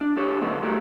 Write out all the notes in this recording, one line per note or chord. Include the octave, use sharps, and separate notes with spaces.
D4
D4 G4 A4 C#5
D3 F#3 A3 B3 C4 D#4
G3 A3 F#4 A#4